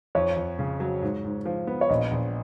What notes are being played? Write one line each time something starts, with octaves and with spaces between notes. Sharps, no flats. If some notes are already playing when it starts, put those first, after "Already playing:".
F2 C#5
F2
C#3
F#3
G#2
G#2
F3
B3
C#5
A#1 D#5
A#1